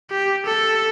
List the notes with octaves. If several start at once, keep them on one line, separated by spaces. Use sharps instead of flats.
G4
A4